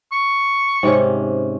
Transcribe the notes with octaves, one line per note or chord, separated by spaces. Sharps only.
C#6
G#2 C3 C#4